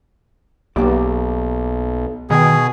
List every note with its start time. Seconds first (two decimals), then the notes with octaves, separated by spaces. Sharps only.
0.76 B1 A#3 G4 D5
2.30 B2 D#3 G#4 G5